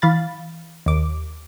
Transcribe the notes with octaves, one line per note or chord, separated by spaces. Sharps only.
E3 F5 B5 A6
D#2 D6